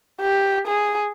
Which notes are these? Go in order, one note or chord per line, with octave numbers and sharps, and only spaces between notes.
G4
G#4